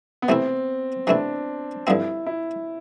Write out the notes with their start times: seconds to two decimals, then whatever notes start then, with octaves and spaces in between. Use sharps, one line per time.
0.22 B3
0.29 C3 E3 A3 C4 E4
1.07 C3 E3 A3 D4 E4
1.87 G2 D3 F3 C4 E4
2.26 E4